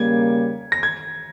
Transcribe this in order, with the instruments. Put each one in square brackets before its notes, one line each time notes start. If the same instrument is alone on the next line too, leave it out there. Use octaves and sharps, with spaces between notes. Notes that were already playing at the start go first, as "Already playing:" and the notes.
Already playing: [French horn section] C#3 G3 A#3 [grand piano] G#6
[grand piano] A#6
G#6